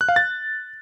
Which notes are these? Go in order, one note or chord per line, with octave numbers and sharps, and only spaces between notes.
F#6
F5
A6